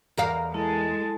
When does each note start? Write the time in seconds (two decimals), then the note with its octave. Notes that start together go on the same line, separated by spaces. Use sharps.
0.17 E2 A#4 F5
0.54 G#3 E4 A4 A5